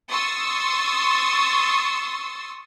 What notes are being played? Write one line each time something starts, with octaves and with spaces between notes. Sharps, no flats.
C6 C#6 D#6 E6 A6